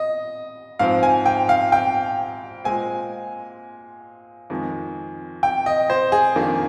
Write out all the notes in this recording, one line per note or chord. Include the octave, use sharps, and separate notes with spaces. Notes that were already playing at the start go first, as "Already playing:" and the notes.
Already playing: D#5
G#2 F3 C4 F5
G#5
G5
F5
G5
A#2 G#3 C4 G#5
F2 D#3 G#3
G5
D#5
C5
G#4
F2 D#3 A#3 D4